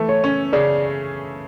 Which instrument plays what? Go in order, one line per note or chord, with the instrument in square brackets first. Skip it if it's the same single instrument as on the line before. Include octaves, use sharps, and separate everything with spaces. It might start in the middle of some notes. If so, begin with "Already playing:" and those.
Already playing: [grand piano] E3 A3
[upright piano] C#5
[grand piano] C#4
[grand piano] C#3 [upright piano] D5